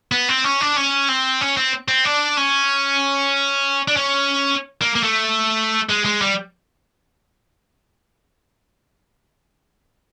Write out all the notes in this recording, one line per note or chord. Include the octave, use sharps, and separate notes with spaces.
B3
C4
C#4
D4
C#4
C4
C#4
C4
C4
D4
C#4
D4
C#4
A#3
A#3
A3
G#3
G#3
G3